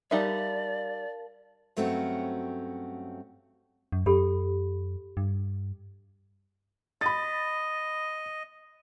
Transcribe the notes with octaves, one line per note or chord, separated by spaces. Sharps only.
G3 D#4 A#4 D5 E5 F5 A5
G2 F#3 A3 C4 C#4 F#4
F#2
F#2 G4 A4 B5
G2
D#5 B5 A6